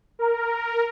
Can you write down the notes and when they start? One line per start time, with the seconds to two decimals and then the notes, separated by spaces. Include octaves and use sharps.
0.19 A#4